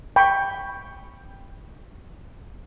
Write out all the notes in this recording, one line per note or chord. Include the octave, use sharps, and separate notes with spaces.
G5 B5 C#6